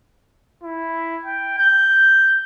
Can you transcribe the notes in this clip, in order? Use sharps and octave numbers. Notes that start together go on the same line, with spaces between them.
E4
G5
G6